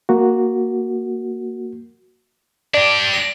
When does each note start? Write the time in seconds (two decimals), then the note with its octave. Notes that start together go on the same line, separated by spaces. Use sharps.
0.09 A#3 F#4
2.74 D4 G4 D5
3.13 A#6